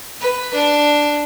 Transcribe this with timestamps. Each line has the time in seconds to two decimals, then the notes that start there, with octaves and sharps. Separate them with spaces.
0.21 B4
0.54 D4